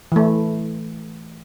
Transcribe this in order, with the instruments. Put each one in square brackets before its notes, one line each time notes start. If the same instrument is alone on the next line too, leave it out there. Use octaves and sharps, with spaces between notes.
[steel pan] E3 A3